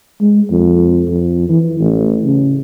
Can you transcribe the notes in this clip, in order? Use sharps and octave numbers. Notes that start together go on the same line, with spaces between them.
G#3
F2
F2
E3
A1
C#3